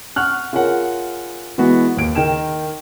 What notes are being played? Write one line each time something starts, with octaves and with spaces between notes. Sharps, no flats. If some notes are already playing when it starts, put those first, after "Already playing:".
F#5 C#6 F6 F#6
F4 G#4 A#4 C#5 F#5
E3 G#3 B3 F#4
D#2 D7
D#3 A#4 G5 E7